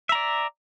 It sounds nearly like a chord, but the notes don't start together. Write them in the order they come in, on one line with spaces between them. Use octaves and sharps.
E5 A#5 D5